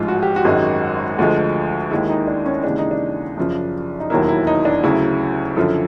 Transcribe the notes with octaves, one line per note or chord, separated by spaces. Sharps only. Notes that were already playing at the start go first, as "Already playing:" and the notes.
Already playing: A1 G#2 F3 G#3 F4
F#4
G4
F#4
G#1 F#2 D#3 G#3
D2 D3 F3 G#3
D#2 D#3 G#3 E4
D#4
D4
C#4
D#2 C#3 E3 G#3 D4
D#4
D4
F#2 C#3 F3
D#4
E1 D#2 D#3 F#3 A#3 E4
E4
D#4
D4
D2 C#3 F#3 E4
F#2 D3 F3